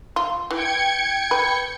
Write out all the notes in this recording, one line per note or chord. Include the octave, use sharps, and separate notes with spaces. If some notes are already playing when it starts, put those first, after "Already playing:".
F4
E3 G5 G#6 C#7
B4